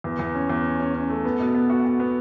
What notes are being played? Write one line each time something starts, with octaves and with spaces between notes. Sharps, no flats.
E2
E2
C#4
E2
C#4
C#4
C#4
A3
B3
B2
B3
F#4
F#4
B3